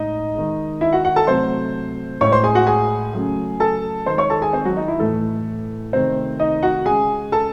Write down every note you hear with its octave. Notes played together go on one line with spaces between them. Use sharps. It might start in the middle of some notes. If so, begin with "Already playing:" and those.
Already playing: A2 G#3 D#4 D#5
D#3 G#3
E4 E5
F#4 F#5
F#4 F#5
A4 A5
C3 F#3 A3 C5 C6
A2 G#3 C#5 C#6
C5 C6
G#4 G#5
F#4 F#5
G#4 G#5
C#3 F#3 A3
A4 A5
D#3 G#3 C5 C6
C#5 C#6
A4 A5
G#4 G#5
C4 C5
F#3 F#4
D#4
E4
A2 E3 A3 A4
C3 D#3 A3 C4 C5
D#4 D#5
F#4 F#5
C#3 G#3 G#4 G#5
A4 A5